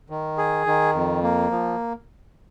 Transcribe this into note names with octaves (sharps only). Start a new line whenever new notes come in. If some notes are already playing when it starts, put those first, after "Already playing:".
D#3
G#4
D#3
F2
A#3
F3